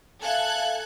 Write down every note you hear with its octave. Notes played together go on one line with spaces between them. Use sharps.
A4 E5 F5 G#5 F#6 G#6